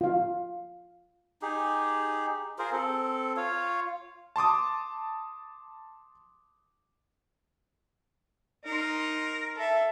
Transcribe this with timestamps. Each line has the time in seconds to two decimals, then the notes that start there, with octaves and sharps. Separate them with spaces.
0.01 F4 F5
1.42 D#4 G4 G#4
2.59 F4 G#4 A#4 C5
2.72 C4 A4
3.37 F4 C#5 F5
4.36 A5 C6 D6 D#6
8.65 D#4 A#4 C6
9.57 A4 E5